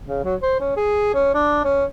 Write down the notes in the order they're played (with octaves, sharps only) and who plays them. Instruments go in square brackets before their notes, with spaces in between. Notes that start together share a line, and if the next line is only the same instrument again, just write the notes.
[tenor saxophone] C#3
F#3
C5
C#4
G#4
C#4
D4
C#4